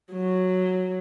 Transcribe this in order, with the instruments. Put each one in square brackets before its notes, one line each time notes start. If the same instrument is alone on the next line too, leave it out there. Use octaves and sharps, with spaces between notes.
[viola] F#3